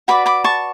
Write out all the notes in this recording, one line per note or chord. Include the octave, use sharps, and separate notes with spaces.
F#4 B4 D5 B5 D6
B5 D6
A5 C#6